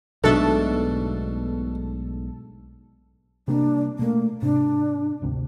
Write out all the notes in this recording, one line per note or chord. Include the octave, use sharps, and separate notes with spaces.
B1 G#2 B2 A3 D4 A4
C3 G3 A#3 D4
B2 A3 A#3
G#2 C3 D4
G#1 D2 C3